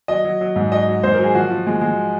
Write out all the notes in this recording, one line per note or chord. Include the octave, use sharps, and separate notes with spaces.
F#3 D#5
F#3
F#3
G#2
F#3 D#5
F#3
G#2 C5
F#3 A#4
G#4
F3 F#4
F3
G#3
G#3